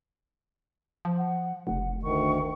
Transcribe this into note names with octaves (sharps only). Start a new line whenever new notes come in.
F3
F#5
F1 F#5
D2 D#3 C#6